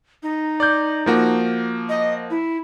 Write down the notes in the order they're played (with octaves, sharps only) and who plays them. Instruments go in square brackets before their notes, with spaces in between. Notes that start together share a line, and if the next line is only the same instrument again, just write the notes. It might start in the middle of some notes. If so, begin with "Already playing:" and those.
[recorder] D#4
[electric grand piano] D5 G6
F3 A#3 F#4
[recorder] D#5
E4